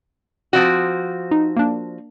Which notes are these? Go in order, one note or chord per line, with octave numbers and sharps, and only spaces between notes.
F3 C4 F#4
D#4
A#3 D4